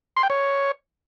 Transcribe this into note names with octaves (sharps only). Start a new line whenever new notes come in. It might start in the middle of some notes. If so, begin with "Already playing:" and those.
C6
G5
C#5